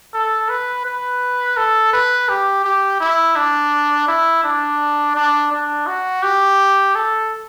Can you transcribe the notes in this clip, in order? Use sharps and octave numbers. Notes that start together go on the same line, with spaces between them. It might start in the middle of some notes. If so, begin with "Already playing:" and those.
A4
B4
B4
A4
B4
G4
G4
E4
D4
E4
D4
D4
D4
F#4
G4
A4